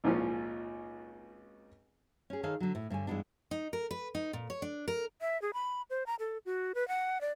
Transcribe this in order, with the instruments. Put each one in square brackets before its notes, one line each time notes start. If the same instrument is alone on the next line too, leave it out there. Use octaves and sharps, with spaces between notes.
[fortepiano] G#1 C#2 A#2 F3 C#4
[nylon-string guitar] C#4 G#4
D#3 G#4 A4 C#5 F5
D3 F#3
A2
G2 D3 C#5 G#5
G2 E3 F#3 G#3 B3 D4
[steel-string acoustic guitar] D#4
A#4
B4
D#4
A#2
C#5
D4
A#4
[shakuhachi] E5
G#4
B5
C5
A#5
A4
F#4
B4
F#5
D5